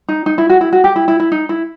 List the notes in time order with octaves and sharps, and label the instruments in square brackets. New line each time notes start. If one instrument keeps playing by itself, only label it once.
[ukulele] D#4
D#4
E4
F#4
E4
F#4
G4
E4
E4
E4
D#4
E4